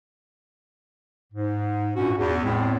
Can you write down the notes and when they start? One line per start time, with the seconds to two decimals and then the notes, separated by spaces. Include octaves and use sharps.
1.33 G#2
1.96 G2 A#2 C#4 F#4
2.18 E2
2.43 A2 G#3 B3 C4